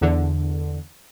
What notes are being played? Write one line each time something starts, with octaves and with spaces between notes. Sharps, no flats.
E2 D3